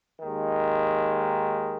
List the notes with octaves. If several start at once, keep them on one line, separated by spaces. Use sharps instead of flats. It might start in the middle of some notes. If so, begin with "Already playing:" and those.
D#2 D#3 G#3